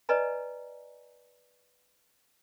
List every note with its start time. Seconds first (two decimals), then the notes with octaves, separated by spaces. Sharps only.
0.09 B4 D5 D#5 G#5 A#5